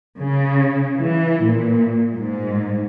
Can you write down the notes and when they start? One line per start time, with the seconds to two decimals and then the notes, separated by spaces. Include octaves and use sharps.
0.18 C#3
0.98 E3
1.43 A#2
2.14 G#2